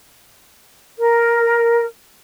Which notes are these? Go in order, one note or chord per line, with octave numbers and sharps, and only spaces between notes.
A#4